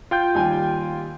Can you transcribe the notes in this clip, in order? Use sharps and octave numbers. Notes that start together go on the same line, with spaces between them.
F4 G5 G6
D#2 G3 G#5